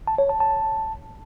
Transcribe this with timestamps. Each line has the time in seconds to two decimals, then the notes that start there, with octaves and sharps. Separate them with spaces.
0.07 A5
0.18 C#5
0.29 A5
0.40 A5